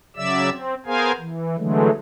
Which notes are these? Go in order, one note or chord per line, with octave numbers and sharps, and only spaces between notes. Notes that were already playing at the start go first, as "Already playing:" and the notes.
C#3 F#3 D5 E5 E6
C4
B3 G#4 A#4 C5 F5 G#5
E3
D3 E3 F#3 G#3 A3